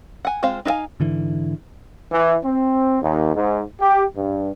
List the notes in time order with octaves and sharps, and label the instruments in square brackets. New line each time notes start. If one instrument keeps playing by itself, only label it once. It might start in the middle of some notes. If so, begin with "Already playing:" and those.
[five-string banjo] F#5 G#5
G#3 C4 F4 C5 F5
D#4 F4 F#4 F5 G#5
[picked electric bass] G#2 D3 E3
[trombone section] E3
C4
D#2
G#2
G4
G2